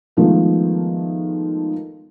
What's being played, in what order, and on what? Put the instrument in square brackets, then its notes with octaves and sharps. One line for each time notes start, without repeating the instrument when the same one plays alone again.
[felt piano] D#3 F3 G#3 A3 B3